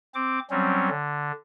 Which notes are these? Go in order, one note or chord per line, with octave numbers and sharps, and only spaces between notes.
C4 D6
F#3 G3 C4 C#4
D3